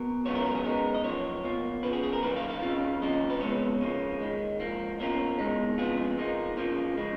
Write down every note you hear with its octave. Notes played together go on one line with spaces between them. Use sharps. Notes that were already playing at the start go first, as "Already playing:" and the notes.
Already playing: B2 A#4
C#2 C#3 F#3 B3 F4 C#5
A#4
A#4
G#4
C#3 G#3 B3 D#4 A#4
D#5
F#2 F3 A#3 C#5
B2 A#3 F4
C#3 F3 B3 B4
G#4
G#4
A#4
F#2 D#3 A#3 B4
F5
F5
D#2 C#3 F#3 C#4 F4
F#2 D#3 A#3 C#4 F4 D#5
B4
F2 C#3 G#3 B3 C#5
C#2 C#3 F3 A#3 C#4
D#2 D#3 G#3
G#2 F3 A#3
B2 A#3 C#4 F4 A#4
C#2 B2 G#3 D#4
F2 C#3 G#3 B3 F4 G#4
A#2 F3 A#3 D#4
C#3 F3 A#3 F4
C#3 F3 G#3